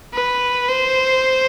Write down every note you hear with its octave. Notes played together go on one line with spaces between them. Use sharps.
B4
C5